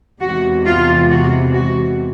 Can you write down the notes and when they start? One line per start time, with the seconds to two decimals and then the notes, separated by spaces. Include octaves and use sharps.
0.21 E2 C3 E3 G#3 F#4
0.66 F4
1.10 F#4
1.54 F#4